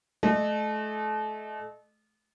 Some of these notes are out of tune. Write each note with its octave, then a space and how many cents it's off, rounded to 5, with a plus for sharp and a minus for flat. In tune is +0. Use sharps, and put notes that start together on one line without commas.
A3 -35 D#5 -35